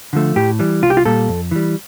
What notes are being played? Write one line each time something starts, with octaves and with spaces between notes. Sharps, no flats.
D3 F3 A3
A2 G4
E3 G3
C2 F4
G4
F4
A#2 G3 A4
F2
E3 G3